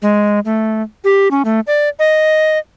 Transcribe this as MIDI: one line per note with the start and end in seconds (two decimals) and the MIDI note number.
0.02 0.39 56
0.45 0.82 57
1.04 1.28 67
1.31 1.42 61
1.45 1.60 57
1.67 1.89 74
1.99 2.58 75